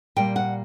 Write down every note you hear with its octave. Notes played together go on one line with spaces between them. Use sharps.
A#2 G3 A#3 G5
F#5